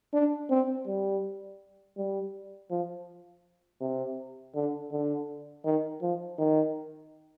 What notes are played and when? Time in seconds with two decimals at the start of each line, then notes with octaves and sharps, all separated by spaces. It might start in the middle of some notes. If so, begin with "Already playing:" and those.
0.13 D4
0.50 C4
0.87 G3
1.97 G3
2.71 F3
3.81 C3
4.55 D3
4.92 D3
5.65 D#3
6.02 F3
6.39 D#3